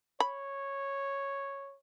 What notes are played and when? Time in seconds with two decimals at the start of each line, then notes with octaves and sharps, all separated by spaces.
0.20 C#5 B5